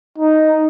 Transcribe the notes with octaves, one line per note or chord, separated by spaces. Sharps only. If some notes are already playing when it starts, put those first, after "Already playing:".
D#4